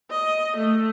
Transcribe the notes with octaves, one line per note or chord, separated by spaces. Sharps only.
D#5
A3